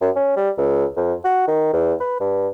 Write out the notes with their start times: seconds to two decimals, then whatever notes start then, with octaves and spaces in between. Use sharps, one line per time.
0.01 F#2
0.16 C#4
0.36 G3
0.58 C#2
0.97 F2
1.25 F#4
1.48 D#3
1.73 E2
2.01 B4
2.20 G2